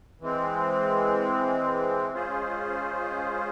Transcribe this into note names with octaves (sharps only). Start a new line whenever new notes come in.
E3 G#3 C4
G#3 C#4 F4 G#4 C5